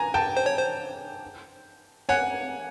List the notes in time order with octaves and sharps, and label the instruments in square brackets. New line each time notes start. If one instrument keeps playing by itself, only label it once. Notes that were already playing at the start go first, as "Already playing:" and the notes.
Already playing: [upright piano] G#5 A#5
G5 A5
[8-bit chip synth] C5
C#5
C5
[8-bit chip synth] C#5 [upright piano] F#5 G#5